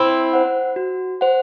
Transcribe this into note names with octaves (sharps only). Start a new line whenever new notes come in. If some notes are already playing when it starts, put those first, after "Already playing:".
Already playing: C4 E4
C5 F#5
F#4
C5 F#5